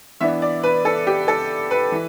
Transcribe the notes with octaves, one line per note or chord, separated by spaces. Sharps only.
E3 B3 D4 E5
D5
B4
A4
G4
A4
B4
E3